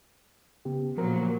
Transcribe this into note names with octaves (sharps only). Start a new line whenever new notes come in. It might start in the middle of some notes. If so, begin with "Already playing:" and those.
C#3 B3 G4
A#2 F3 F#3 A#4 C5